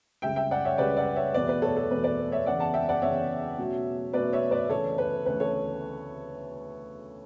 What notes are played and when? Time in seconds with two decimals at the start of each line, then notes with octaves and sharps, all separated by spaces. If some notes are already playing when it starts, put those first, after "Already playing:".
0.22 C#2 C#3 G3 E5 G5
0.36 E5 G5
0.51 D5 F#5
0.65 C#5 E5
0.78 C#2 C#3 G3 B4 D5
0.97 D5 F#5
1.16 C#5 E5
1.34 E2 B2 A3 B4 D5
1.49 B4
1.62 A4 C#5
1.76 A4
1.91 E2 B2 A3 B4
2.04 B4 D5
2.32 C#5 E5
2.46 E2 C#3 E3 D5 F#5
2.60 F#5 A5
2.74 E5 G5
2.89 D5 F#5
3.02 E2 C#3 E3 C#5 E5
3.58 B2 F#3 A3 C#4
4.13 B2 F#3 A3 C#4 B4 D5
4.33 C#5 E5
4.51 B4 D5
4.70 D2 C#3 E3 A4 C#5
4.98 B4
5.26 D2 C#3 E3 B4
5.40 A4 C#5